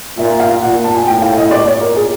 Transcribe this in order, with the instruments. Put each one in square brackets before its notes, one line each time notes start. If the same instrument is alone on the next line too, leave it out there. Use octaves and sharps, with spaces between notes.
[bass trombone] A#2 [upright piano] E5
[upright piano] F5
[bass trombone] A#2 [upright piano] F#5
[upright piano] A5
G#5
[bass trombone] A2 [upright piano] G5
[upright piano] F5
D#5
[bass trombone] A#2 [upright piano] D5
[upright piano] C#5
A#4
G#4